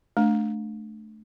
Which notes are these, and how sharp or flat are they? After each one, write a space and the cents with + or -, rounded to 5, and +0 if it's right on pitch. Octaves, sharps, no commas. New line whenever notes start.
A3 -20 D4 +0